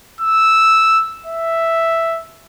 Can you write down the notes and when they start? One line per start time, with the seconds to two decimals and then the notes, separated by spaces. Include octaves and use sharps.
0.21 E6
1.26 E5